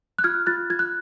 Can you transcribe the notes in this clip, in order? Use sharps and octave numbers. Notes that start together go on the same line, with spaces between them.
F#6
F4 F6 G#6
F4 F#6 A6
F4 G#6
F#6